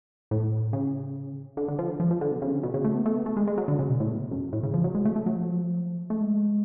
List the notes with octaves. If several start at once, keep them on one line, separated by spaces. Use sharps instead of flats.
A2
C#3
D3
D3
F3
D3
F3
F3
D3
B2
C#3
D3
B2
C#3
A3
B3
A3
B3
A3
G#3
G#3
F#3
D3
C#3
B2
A2
B2
F#2
A2
C#3
F3
F#3
G#3
A3
A3
F#3
F3
A3
G#3